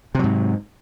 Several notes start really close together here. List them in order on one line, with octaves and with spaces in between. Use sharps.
C3 F#3 G#2